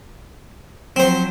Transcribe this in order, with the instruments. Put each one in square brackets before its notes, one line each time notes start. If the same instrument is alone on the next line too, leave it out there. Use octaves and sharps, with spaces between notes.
[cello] F3 F#3 [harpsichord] C4 C5